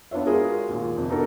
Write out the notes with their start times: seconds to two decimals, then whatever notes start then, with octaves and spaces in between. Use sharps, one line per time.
0.11 B3 D4 F4 C#5 E5
0.26 G#3 F4 F#4 G#4 A#4
0.69 D#2 A#2
0.97 F2 C3
1.09 B3 D4 D#4 F#4 A4 A#4